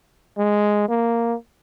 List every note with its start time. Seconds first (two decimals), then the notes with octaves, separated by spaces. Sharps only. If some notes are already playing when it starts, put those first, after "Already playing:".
0.38 G#3
0.89 A#3